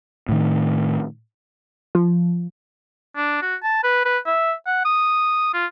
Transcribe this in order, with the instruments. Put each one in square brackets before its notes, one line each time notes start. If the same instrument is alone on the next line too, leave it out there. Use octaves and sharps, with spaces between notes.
[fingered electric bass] A2 D#3
[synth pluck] F3
[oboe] D4
F#4
A5
B4
B4
E5
F#5
D#6
F4